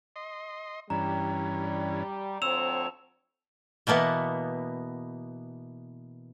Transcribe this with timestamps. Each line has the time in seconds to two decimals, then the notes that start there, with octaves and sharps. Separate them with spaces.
0.16 D#5 C6
0.90 G2 E3 G3 C#4 A#5
2.42 D2 F3 C4 C#5 E6 E7 F7
3.87 B2 E3 A#3 B3